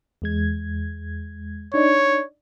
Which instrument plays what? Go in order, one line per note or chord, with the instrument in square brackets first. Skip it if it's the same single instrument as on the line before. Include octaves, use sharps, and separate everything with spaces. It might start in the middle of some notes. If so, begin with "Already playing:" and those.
[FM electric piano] E2 G#3 G#6
[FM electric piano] D4 D#4 D5 [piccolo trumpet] C#5